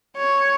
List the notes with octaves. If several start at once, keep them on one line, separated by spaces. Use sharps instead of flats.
C#5